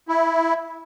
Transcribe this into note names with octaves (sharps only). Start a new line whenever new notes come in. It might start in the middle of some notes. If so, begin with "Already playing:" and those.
E4